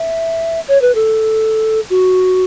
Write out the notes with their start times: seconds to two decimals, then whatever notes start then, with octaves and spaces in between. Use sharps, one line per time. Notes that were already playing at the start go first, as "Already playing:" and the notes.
Already playing: E5
0.68 C#5
0.81 B4
0.95 A4
1.90 F#4